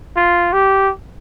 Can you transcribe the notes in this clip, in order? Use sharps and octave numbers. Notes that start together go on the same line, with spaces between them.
F4
G4